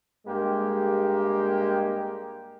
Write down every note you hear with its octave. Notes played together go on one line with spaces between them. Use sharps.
G2 G#3 A#3 G4